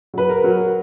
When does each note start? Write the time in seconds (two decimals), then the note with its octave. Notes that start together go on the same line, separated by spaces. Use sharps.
0.14 F#3 B4
0.29 A#4
0.44 F#3